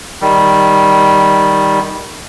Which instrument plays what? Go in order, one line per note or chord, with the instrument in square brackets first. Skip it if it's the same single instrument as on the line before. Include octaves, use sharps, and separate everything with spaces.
[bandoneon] D#3 G3